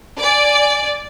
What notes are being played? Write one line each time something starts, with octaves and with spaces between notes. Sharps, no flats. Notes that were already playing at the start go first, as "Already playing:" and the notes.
D5 G#5